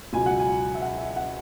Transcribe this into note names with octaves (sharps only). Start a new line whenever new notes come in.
C#2 B2 F#3 G#5
F#5
G#5
E5
F#5
E5
F#5